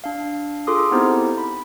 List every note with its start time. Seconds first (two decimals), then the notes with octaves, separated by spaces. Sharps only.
0.04 D4 F5
0.67 F4 G#4 A4 C6 D6 D#6
0.92 B3 C4 D#4 E4 G4 C5
1.38 B5